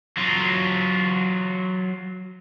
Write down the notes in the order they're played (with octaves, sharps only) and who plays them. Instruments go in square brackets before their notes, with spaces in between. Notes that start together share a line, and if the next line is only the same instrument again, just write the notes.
[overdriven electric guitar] F#3 F4